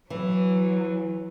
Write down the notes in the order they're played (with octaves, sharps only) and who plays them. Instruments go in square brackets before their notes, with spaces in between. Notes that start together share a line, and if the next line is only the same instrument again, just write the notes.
[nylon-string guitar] E3 [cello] F#3